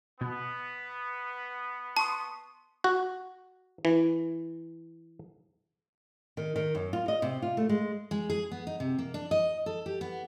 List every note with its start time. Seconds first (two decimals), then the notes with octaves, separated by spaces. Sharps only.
0.21 B2 B3
1.97 A5 C6 C#6 D#6
2.84 F#4
3.85 E3
6.37 D#3
6.56 D#3
6.75 F#2
6.93 F4
7.08 D#5
7.22 C3
7.42 F4
7.57 A3
7.69 G#3
8.11 G#3
8.30 G#4
8.51 B3
8.67 D#4
8.80 C3
8.99 A#3
9.14 D4
9.31 D#5
9.66 A4
9.86 G4
10.01 B3